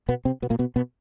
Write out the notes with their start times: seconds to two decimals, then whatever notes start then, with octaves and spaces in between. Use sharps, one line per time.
0.09 B2 B3
0.25 C3 C4
0.42 B2 B3
0.50 A#2 A#3
0.59 B2 B3
0.76 B2 B3